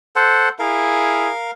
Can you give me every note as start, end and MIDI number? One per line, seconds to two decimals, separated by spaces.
0.16 0.49 69
0.16 0.49 72
0.16 0.49 78
0.59 1.30 64
0.59 1.30 68
0.59 1.51 70
0.59 1.51 77